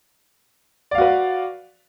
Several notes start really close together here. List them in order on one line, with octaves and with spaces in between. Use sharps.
D5 F5 F#4 B4